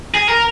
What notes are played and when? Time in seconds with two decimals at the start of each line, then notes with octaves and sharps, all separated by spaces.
0.14 G#4
0.29 A#4